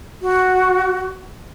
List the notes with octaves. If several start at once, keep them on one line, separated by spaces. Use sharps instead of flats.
F#4